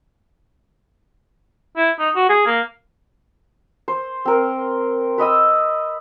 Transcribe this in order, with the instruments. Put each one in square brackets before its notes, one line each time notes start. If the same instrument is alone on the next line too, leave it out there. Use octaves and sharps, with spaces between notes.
[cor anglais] E4
D#4
F#4
G#4
A#3
[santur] C5
C4 A#4
B4 D#5 D#6 E6